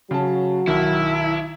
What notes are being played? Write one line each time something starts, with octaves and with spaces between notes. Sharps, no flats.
C#3 F#3 F#4 A5
B1 D#3 E4